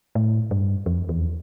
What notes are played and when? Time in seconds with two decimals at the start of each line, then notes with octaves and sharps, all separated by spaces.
0.15 A2
0.51 G2
0.86 F2
1.09 E2